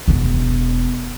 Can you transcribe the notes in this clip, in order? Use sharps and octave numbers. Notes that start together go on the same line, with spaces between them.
E1 B3